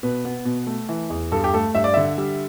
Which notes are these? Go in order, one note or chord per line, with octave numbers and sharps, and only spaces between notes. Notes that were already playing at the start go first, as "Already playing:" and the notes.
B2 B4
B3
B2
A3
E3
E2
G2 A4
G4
A3 A4
G2 E5
D5
D3 E5
G3